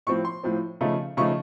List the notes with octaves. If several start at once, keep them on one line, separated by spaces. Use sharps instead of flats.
A2 F3 C4 C#6
C6
A2 F3 C4
C#3 F3 A3 D#4
C#3 F3 A3 D#4 C#6